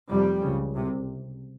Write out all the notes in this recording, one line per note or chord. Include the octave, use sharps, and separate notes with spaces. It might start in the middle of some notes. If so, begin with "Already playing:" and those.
F1 F2 C3 G3
C#2 C#3
C2 C3